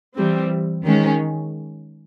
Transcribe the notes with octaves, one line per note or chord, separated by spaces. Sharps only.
E3 G3 C4
D#3 G#3 C#4